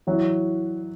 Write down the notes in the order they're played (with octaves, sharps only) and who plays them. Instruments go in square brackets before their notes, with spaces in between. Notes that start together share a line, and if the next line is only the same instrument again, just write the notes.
[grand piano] E3 F#3